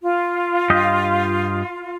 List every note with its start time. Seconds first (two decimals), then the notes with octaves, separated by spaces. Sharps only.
0.01 F4
0.70 G2 G4 D#5